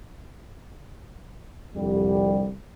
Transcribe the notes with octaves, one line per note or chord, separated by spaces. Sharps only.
C2 F2 D3 G3